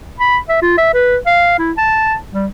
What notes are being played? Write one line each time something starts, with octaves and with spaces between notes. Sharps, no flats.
B5
E5
F4
E5
B4
F5
E4
A5
G3